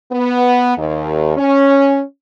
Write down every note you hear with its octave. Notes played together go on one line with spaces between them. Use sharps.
B3
D#2
C#4